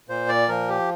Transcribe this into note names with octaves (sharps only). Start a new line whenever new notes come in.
A#2 C5
D5
F3 A#4
G4